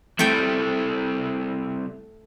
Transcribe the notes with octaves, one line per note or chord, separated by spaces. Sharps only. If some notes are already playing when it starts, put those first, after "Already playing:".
G3 A3 C4 E4 G5